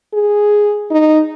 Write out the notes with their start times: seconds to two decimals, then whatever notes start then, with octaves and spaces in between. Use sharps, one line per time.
0.13 G#4
0.91 D#4